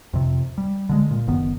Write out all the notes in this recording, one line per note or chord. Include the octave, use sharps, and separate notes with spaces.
F2 C3
G3
D3 F3 G#3
A#2
F#1 D#3 B3